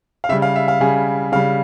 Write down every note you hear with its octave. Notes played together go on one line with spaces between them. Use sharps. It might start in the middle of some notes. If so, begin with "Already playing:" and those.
F5
C#3 G3 E5
F5
E5
F5
C#3 G3 G#4
C#3 G3 F5